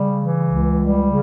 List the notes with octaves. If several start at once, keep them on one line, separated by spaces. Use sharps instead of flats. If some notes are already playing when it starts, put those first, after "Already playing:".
Already playing: C#3 G3
E3
C#2
G3
C#3